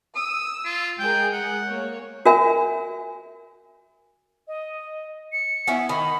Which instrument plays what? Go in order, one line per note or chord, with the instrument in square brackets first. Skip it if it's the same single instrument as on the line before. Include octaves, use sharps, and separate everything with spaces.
[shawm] D#6 [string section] E6
[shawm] F4
[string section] G#3 G#4 A#4 [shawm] G5
[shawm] F#5
[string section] A#3 C#5
[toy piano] F#4 A#4 E5 G#5
[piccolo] D#5
C#7
[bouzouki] B3 C#4 E4
[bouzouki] D#3 G#5 [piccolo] B5